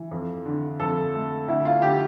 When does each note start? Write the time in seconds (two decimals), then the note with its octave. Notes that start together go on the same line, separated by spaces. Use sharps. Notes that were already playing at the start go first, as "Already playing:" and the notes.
Already playing: E3
0.11 F2
0.46 D3
0.80 F2 A4
1.14 A3
1.48 D2 E4
1.65 F4
1.82 D3 G4